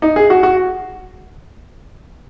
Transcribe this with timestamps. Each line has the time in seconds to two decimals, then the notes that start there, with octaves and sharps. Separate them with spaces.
0.02 D#4
0.16 G#4
0.30 F#4
0.43 F#4